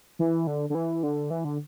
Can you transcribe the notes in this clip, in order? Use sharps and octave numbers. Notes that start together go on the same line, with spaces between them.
E3
D3
D3
E3
D3
E3
D3